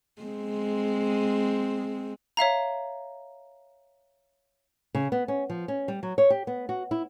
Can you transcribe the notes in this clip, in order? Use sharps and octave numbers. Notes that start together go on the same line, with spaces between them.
G#3 C4
C#5 E5 F5 A#5
C#3
B3
C#4
F3
C#4
G3
F#3
C#5
G4
B3
F#4
E4